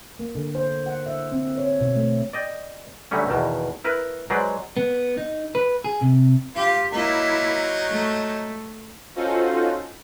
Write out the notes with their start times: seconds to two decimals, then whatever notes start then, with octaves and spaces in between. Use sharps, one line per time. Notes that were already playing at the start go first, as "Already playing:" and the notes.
0.19 A#3
0.35 D3
0.55 C5
0.86 F#5
1.06 E5
1.32 C4
1.57 C#5
1.80 B2
1.96 A3
2.33 D5 D#5 G5
3.11 D3 F#3 G3 A3 C#4
3.28 E2 B2 D#3
3.84 E4 A#4 B4
4.30 F#3 G#3 B4 C5 D5
4.77 B3
5.17 D#4
5.55 B4
5.84 G#4
6.01 C3
6.55 F4 G4
6.93 F#3 A#3 D#4 E4
7.88 A3
9.16 C#4 D#4 F4 F#4 A4 C5